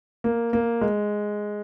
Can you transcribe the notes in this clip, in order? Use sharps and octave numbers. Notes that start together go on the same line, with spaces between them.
A#3
A#3
G#3